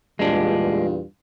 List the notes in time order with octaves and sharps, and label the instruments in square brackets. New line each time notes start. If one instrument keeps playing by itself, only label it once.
[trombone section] E2 A#2 F4 [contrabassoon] G2 [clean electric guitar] G#3 D4